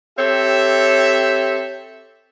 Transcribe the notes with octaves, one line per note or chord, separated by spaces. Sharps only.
C4 G4 A4 C#5 E5